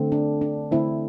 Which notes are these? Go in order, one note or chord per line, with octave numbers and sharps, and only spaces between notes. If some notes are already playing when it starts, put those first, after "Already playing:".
Already playing: D3 A3 C4
D4
D4
D3 A3 C4 E4